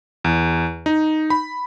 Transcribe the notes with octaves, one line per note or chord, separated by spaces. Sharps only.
E2
D#4
B5